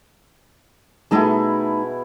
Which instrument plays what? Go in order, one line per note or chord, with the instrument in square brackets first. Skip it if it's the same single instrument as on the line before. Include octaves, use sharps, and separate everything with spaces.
[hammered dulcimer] B2 E4 G#4 [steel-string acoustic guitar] A3 D#4 A5